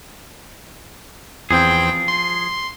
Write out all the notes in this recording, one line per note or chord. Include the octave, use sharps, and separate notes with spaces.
E2 F3 C4 G#4 G5
C6